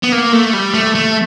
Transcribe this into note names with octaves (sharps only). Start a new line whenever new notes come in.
B3
A#3
A3
G3
A3
A3